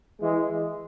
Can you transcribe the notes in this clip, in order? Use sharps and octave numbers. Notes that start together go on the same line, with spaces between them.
E3 G#3